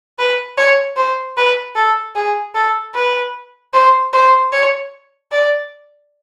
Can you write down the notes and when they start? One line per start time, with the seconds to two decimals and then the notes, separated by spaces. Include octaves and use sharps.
0.19 B4
0.57 C#5
0.97 C5
1.37 B4
1.75 A4
2.15 G#4
2.54 A4
2.94 B4
3.73 C5
4.13 C5
4.52 C#5
5.32 D5